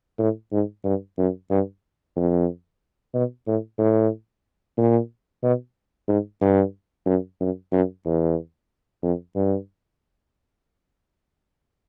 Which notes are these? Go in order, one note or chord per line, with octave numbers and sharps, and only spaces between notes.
A2
G#2
G2
F#2
G2
F2
B2
A2
A2
A#2
B2
G#2
G2
F#2
F#2
F#2
E2
F2
G2